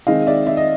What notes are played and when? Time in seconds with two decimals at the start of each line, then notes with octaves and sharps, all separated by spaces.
0.07 D#3 G#3 C4 D#5 F5
0.27 D5 E5
0.47 D5 E5
0.57 D#5